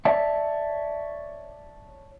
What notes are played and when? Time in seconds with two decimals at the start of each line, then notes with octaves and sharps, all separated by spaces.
0.05 C#5 D5 E5 A5